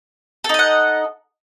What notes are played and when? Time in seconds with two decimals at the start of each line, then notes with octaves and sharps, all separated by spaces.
0.44 A4
0.49 D#4
0.54 D#5
0.59 F#5